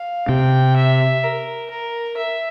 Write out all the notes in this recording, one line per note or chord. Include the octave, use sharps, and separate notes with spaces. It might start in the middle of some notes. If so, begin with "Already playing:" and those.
Already playing: F5
C3 G5
E5
A#4
A#4
E5